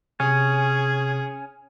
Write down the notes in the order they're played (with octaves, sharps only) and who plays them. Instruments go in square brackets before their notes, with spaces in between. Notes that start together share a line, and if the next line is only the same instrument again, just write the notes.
[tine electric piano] C3 [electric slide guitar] C#4 [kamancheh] G#4